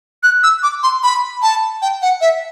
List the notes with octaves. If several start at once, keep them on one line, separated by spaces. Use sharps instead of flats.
F#6
E6
D6
C6
B5
A5
G5
F#5
E5